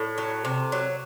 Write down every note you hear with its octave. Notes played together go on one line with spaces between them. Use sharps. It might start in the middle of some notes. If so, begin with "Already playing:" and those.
Already playing: A2
F#3
C3
F#3